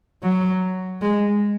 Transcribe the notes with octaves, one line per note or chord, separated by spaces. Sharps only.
F#3
G#3